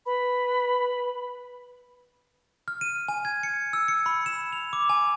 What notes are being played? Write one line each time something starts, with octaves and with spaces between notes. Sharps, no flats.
B4 B5
F6
D#7
G#5
G#6
C#7
E6
C#7
B5
E7
F7
D6
G#5